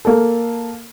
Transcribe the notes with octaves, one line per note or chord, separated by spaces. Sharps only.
A#3 A4